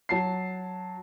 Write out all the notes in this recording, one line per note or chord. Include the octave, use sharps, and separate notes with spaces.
F#3 A5 C7